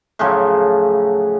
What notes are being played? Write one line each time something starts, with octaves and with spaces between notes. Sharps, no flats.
A2 C#3 F3 F#3